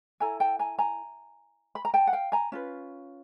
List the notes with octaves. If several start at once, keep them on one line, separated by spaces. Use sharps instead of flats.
E4 A4 G#5 A#5
G5 A5
G#5 A#5
G#5 A#5
B5
A#5
G5 A5
F#5
F5 G5
G#5 A#5
C#4 F4 B4